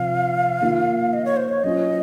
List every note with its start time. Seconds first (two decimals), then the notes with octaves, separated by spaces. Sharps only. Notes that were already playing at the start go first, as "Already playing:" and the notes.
Already playing: C3 F3 C4 F4 F5
0.61 D#3 A#3 F4
1.13 D#5
1.25 C#5
1.36 C5
1.49 C#5
1.64 F#3 C#4 F4 D#5